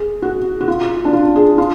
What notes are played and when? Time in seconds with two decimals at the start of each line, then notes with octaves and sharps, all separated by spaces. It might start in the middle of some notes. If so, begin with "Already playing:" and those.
Already playing: G#4
0.22 F#4
0.61 F#4
0.68 F4
1.05 D4
1.13 F4
1.36 G#4
1.58 F4